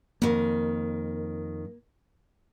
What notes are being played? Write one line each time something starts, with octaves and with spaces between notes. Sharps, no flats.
F2 D#3 A#3